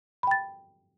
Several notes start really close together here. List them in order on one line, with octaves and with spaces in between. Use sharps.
B5 G5 A6